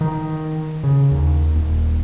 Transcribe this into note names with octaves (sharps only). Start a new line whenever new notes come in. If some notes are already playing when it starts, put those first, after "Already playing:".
D#3
C#3
D#2
D#1